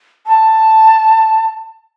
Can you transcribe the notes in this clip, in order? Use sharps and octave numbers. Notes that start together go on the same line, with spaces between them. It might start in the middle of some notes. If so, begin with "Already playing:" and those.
A5